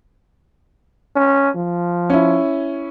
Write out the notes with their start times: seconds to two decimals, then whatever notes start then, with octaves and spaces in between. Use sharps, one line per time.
1.15 C#4
1.56 F3
2.10 C#4 E4